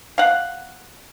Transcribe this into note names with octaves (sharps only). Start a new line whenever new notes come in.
F5 F#5